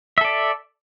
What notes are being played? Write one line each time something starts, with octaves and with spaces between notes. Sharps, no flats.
A4 D5 E5